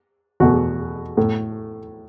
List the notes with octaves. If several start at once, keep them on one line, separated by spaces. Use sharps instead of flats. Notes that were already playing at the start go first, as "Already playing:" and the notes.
E2 B2 A3 F#4
A2 A3